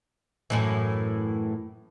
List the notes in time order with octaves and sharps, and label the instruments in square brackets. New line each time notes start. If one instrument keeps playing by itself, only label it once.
[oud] F#2 A2 E3